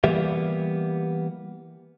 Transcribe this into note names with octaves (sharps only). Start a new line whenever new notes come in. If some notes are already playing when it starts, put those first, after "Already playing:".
E3 G3 A#3 B3 G4 E5